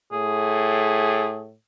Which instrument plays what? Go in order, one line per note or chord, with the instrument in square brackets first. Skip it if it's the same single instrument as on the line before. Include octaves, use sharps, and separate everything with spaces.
[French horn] A2 [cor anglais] G#4